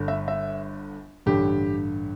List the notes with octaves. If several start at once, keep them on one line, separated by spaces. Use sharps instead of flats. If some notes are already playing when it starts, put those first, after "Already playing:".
Already playing: G1 G2 D3
E5
E5
A1 G2 D3 G4